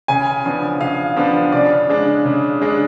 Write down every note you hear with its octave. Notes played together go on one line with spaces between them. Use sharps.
C#3 G#5
F3 B3 D4
C#3 F5
F3 B3 D4
C#3 D5
G#3 D4
C#3
G#3 D4